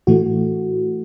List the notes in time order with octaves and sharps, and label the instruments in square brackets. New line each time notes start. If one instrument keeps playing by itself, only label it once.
[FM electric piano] A2 E3 A3 F#4